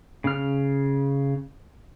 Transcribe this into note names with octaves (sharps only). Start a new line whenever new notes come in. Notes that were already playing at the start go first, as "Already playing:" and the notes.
C#3 F6